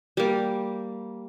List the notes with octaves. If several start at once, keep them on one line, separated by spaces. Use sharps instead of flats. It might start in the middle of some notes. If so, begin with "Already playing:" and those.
G3 A#3